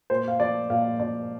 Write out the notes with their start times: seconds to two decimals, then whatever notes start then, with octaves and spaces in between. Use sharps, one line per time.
0.10 A#2 C5
0.28 F5
0.40 F3 D5
0.70 A#2 F5
1.00 F3 D5